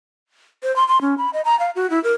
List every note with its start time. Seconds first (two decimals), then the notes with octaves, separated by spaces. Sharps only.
0.63 C5
0.76 C6
0.88 C6
1.01 C#4
1.18 B5
1.33 D#5
1.45 A#5
1.59 F5
1.76 F#4
1.90 E4
2.04 A#4